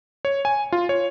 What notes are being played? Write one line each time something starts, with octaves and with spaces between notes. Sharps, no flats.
C#5
G#5
F4
C#5